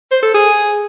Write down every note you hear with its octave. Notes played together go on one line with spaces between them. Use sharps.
C5
A4
G#4